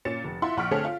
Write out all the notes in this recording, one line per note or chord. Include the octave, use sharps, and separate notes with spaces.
A#2 C#4 A6 C#7 E7
F1
E4 F4 E5 F#5 C6
A#1 F#5 C#6 F6 B6 D7
D3 A3 C4 G#4 A4 C#5
F4